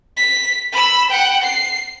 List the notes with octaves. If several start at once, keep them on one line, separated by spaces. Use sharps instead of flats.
B6
B5 E6
F#5 G5
C7